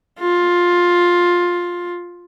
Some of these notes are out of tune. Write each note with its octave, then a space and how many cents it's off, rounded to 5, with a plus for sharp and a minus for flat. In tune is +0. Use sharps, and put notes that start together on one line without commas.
F4 +10